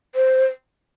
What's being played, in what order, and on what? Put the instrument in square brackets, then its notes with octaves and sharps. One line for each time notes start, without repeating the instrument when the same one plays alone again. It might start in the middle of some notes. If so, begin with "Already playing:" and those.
[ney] C5